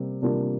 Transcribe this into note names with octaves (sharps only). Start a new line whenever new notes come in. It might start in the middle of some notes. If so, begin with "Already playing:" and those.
Already playing: C3 G3 A#3
C3 G3 A#3 D4 F4